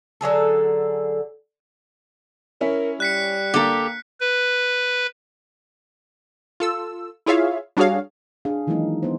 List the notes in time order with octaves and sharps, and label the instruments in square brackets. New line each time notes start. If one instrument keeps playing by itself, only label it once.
[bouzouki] D3 F#3 G#4 A4
[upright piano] C#4 E4 [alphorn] A#4
[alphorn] G3 [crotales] F#6 B6 C#7
[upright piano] D3 A#3 [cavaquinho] G4 A4
[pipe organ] B4
[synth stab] F4 A4 E6
E4 F4 G#4 C#5 E5 F5
G3 D4 F#4 G#4 C#5 F5
[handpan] D4 G#4 F5
D#3 E3 F#3 G#3 A#3 D#4
B3 C5